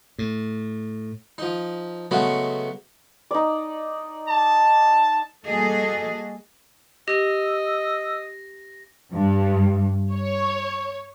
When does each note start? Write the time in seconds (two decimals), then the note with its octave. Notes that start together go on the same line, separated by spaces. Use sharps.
0.19 A2
1.38 F3 D#4
2.11 C#3 F#3 G#3 A3 B3
3.31 D#4 D5
4.28 A5
5.47 G3 A#3 F#4 G#4 A4 D#5
7.08 G4 D#5 E6 A#6
9.12 G2
10.14 C#5